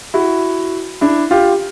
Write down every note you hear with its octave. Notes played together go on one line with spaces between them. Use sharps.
E4 F#4
D4 E4
F4 G4